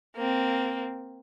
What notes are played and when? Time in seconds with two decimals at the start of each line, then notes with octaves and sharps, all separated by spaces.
0.16 A#3 C4